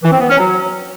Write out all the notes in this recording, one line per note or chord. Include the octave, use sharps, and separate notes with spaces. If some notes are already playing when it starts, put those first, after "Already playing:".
E3
C4
B3
C#4
F#3